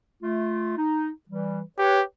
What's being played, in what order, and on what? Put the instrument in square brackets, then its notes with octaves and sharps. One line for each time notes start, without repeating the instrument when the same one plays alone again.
[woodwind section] A3 F4
D#4
E3 G3
[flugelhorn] G4 [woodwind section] B4 C#5